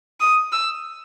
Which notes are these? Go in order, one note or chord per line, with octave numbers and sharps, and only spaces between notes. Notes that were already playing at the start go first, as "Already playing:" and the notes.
D#6
E6